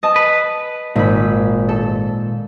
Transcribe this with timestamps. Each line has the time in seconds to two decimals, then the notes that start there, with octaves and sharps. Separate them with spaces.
0.03 D#5 A5
0.16 B4
0.96 G#1 A#2 B5
1.69 A4